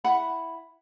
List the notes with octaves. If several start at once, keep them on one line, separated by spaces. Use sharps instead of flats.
E4 F#5 B5